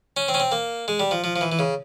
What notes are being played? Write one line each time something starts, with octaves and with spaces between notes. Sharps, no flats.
C#4
C4
C#4
C4
A#3
G#3
G3
F3
F3
F3
E3
E3
C#3